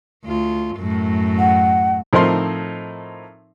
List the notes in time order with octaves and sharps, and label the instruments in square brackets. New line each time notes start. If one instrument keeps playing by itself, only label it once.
[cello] D2 F4
F#2 A2
[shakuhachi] F#5
[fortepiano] A2 F3 C4 D#4 A#4 C6